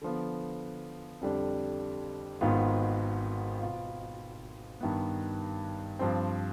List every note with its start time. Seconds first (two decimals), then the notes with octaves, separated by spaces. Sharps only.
0.01 D3 F3 B3
1.21 F2 D3 G3 D4
2.41 G#1 G#2 D#3 B3 F4
3.60 B2 B3 F4
4.81 G2 D#3 B3
5.99 G2 F3 C4